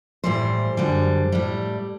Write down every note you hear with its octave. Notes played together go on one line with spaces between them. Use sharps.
A2 E3 G3 C5
F#2 D3 G3
A2 G3